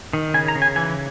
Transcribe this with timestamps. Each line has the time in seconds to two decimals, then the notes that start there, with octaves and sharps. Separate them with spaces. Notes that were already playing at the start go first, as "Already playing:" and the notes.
0.13 D#3
0.34 C#3 G#5
0.48 A#5
0.55 C#3
0.62 G#5
0.76 E3 G#5